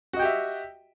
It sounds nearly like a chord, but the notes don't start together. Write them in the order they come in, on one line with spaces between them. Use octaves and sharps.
F#4 D#5 G5 G4 E5